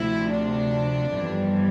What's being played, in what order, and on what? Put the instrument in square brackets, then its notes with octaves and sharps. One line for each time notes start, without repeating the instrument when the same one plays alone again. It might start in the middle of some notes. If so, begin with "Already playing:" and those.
Already playing: [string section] D2 C3 F3 E4
D4
G1 F2 E3 G3